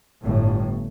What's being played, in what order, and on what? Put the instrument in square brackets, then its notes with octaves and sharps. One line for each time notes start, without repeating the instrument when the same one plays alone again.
[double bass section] G1 A2